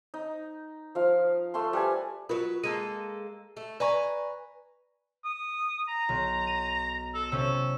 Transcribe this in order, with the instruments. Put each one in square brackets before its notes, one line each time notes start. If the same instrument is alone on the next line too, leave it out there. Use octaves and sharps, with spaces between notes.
[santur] D#4
F3 F5
A3 F5 A5 C6
G3 B4 G#5
[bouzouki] F#3 B4 [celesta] F4 A#4
[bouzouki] G#3 A#3 A4 [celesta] D#7
[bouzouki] A3
[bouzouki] B4 G#5 A#5 [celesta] D5 C#6
[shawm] D#6
A#5
[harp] B1
D#7
[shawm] A4
[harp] C3 C#4 [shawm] A4